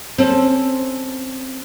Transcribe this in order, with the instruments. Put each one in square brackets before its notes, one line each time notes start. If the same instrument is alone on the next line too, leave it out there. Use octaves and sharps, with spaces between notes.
[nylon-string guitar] C4 C#4 A4